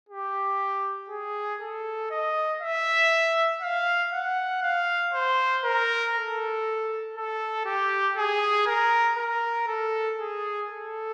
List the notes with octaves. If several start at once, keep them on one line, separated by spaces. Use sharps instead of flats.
G4
G#4
A4
D#5
E5
F5
F#5
F5
C5
A#4
A4
A4
G4
G#4
A#4
A#4
A4
G#4
A4